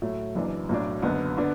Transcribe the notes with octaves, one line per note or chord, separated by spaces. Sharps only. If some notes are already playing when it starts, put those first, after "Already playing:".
A2 F#3 A3
F#1 F#2 E3 D4
B1 A2 F#3 D4
F#1 F#2 D3 B3
D3 B3 D4